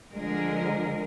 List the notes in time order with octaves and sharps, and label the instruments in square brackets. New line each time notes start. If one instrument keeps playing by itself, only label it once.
[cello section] D3 F3 G#3 A#4